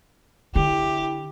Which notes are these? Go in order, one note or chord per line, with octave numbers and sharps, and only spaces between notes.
D3 E4 G4